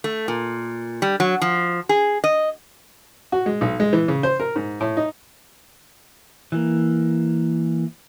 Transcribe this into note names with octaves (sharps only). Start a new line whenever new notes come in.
A3
A#2
G3
F#3
F3
G#4
D#5
F#4
G#3
B1
G#3
E3
C#3
C5
A#4
G#2
A2
D#4
E3 A#3